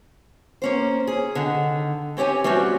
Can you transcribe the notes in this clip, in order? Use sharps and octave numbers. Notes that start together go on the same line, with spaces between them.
A#3 C#4 C5
G#4
D3 D#3
C4 C#4 G4 C#5 G#5
G3 A3 C4 C#4 F#4